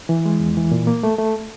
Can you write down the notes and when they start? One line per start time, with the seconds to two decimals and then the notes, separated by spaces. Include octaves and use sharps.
0.09 E3
0.25 G#3
0.40 E2
0.57 E3
0.71 A#2
0.87 A#3
1.03 A3
1.18 A3